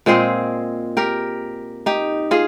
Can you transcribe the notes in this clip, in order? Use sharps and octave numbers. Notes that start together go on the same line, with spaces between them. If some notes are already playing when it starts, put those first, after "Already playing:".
A#2 G#3 C4 G#4 C5
G4 A#4
D#4 G4
F4 G#4